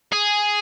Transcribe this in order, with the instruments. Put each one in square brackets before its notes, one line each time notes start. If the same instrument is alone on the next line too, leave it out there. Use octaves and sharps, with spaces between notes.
[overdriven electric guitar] G#4